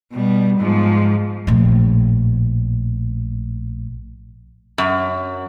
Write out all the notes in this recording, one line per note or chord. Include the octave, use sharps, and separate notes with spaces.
B2 G3
G#2 F3
A#1 A2
F#2